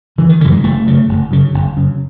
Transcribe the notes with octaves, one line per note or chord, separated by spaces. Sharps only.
F#1 E3
D#3
F#2 C#3 E3
G#3
F#1 A3
F#2 C#3
F#1
F#2 C#3
F#1
F#2 C#3